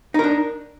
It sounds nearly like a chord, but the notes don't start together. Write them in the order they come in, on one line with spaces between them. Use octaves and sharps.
D#4 A#4 D4